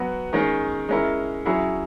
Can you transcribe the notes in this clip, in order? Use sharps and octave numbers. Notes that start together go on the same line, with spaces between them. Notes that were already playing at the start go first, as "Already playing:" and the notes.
Already playing: F#3 B3 F#4
D#3 G#3 C#4 G#4
G#3 C#4 E4 A#4
F#3 C#4 E4 G#4